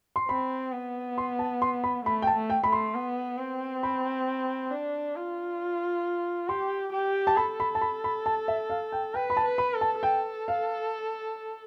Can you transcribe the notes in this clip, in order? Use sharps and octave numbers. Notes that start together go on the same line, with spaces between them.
C6
C4 B5
B3
C6
A5
C6
B5
A3 B5
G5
A5
A3
G5
A3 B5
C6
B3
C4
B5
D4
F4
G4 C6
G4
A5
A4 B5
B5
A5
B5
B5
A5
E5
F5
G5
B4 G5
B5
A5
B4
B5
A4
A5
A4 G5
F5